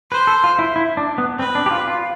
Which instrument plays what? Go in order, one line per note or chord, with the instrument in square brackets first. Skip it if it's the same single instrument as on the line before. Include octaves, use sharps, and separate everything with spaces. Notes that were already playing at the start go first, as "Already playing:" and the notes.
[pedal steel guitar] B4 [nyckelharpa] C5
[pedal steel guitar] A4
F4
E4
E4
D4
B3
[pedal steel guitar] C4 [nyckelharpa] B4
[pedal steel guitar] D4
G4
F4
F4